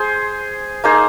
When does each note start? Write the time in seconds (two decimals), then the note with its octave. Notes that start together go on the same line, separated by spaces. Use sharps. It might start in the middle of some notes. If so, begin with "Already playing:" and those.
Already playing: G#4 C5
0.84 A#3 D#4 G#4 C5